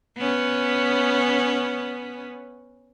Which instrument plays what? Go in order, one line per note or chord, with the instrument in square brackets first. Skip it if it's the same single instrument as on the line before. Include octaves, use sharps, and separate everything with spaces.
[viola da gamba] B3 C#4